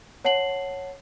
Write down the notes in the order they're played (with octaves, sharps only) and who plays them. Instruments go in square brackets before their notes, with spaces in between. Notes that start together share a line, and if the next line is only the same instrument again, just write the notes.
[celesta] C#5 F#5 A5 C7 F#7